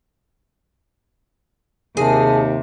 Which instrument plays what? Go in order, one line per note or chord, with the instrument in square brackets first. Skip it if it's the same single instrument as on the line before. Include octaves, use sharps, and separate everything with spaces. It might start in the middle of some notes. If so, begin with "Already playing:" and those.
[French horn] D#2 [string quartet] C3 [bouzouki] G#4 [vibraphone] A#4 A5